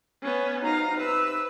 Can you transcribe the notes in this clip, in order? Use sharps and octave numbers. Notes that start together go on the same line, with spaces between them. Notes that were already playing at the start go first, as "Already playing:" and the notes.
B3 C#4
F3 F#3 D#4 F5 A#5
C3 B4 E6